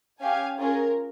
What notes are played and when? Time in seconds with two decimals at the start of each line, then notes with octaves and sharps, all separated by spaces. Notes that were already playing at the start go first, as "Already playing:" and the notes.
0.21 C#4 G4 F5 G#5
0.59 C#4 F4 G#4 A#4